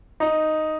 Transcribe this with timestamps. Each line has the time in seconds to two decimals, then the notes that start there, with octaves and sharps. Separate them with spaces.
0.20 D#4